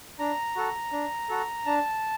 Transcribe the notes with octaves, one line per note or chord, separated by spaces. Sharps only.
D4 A#5
F#4 A4
D4
F#4 A4
D4 A5